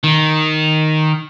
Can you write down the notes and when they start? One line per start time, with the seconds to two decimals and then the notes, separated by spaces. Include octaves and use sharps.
0.04 D#3